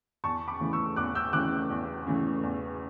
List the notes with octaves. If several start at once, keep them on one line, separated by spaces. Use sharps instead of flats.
E2 A5 C#6
B5 D6
C#3 E3 A3
C#6 E6
E2 D6 F#6
E6 G6
C#3 E3 A3 D6 F#6
E2
C#3 E3 A3
E2